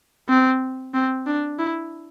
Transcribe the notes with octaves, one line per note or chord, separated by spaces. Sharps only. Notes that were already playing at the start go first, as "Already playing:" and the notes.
C4
C4
D4
E4